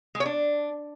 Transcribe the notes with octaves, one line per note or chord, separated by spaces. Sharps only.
G#3
C#5
D4